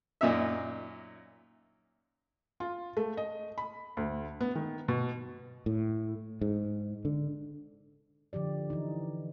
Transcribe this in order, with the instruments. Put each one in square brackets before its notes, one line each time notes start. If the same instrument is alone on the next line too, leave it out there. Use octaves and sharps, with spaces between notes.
[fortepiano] F#2 A#2 D#4 E5
[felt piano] F4
A3
D#5
B5
D2
B3
D#3
B2
[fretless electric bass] A2
G#2
D3
[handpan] D3 F3 G4 D5
E3 D#4